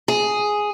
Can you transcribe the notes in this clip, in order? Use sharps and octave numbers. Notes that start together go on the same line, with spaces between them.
G#4